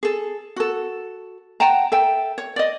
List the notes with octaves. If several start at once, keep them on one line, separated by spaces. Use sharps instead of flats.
G#4 A4
F#4 A4
F#5 G5 A5 A#5
A4 E5 G5
C#5
D5 D#5